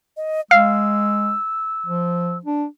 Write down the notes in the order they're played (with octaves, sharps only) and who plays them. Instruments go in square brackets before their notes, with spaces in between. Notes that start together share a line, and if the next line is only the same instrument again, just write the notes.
[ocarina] D#5
[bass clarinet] G#3 [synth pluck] F5 [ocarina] E6
[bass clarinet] F3
D4